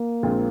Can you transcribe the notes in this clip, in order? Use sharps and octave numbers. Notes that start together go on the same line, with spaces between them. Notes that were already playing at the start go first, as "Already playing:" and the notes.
Already playing: A#3
A#1 A#2 G#3 C4 F4